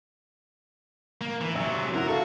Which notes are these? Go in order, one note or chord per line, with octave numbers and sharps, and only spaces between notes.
A#3
E3
C3 F#3 E5
E4 F#4 A#4
F#4 A4 E5 F5